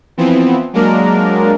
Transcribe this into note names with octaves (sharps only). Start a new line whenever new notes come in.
E3 F3 B3 C4
F#3 G#3 A#3 D4 A#4